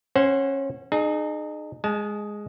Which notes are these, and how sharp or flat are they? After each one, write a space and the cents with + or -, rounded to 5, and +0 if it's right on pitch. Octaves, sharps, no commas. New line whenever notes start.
C#4 -25 C5 +0 F#5 +0
D#4 -35 G#4 +20
G#3 +0 A5 -35